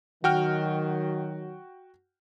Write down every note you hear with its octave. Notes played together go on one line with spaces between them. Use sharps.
D#3 F#3 F#4 G5 F6